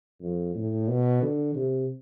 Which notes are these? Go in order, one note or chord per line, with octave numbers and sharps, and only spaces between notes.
F2
A2
B2
D3
C3